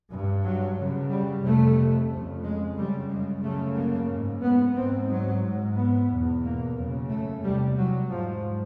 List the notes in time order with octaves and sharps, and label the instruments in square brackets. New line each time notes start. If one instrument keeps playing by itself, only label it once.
[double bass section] G2
F#3
F#2 C#3
G3
F2 C3 A3
F2 C#3
G#3
F#2 C#3 G3
G#3
F#2 C#3 A3
A#3
G#2
B3
G#2 C4
F#3
G#2
B3
E2 B2
A#3
F#2 C#3
A3
E2 C3 G3
F#3
G#2 F3